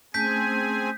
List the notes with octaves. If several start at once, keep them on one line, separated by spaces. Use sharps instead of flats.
A3 C4 C#4 G#4 G#5 A5 G6 B6